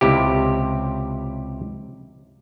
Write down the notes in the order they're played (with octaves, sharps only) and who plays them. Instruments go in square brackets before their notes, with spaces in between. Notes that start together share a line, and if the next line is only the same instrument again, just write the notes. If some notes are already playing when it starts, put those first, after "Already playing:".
[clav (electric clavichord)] C#2 C3 E4 G4